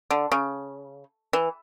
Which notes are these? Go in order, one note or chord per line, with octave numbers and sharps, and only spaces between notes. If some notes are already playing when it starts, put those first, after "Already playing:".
D3
C#3
E3